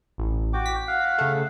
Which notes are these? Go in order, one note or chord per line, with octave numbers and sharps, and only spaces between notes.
A1
F#4 G5 D6
B6
F5 F#5
C#3 A3